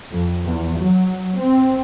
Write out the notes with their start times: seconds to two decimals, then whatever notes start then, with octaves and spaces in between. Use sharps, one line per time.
0.11 F2
0.45 E2
0.79 F#3
1.40 C4